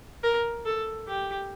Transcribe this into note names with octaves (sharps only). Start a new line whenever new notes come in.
A#4
A4
G4